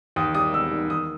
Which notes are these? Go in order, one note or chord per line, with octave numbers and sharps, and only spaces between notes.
D#2 D#6
G3 D#6
E1 E6
D#3
D#3 D#6